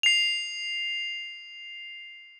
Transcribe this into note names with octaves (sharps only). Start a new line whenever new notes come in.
C7 F7